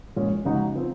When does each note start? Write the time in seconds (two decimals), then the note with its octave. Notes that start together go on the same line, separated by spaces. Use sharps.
0.16 A#2 G#3 C#4 F4
0.45 C#3 G#3 D#4 F#4
0.75 F3 C4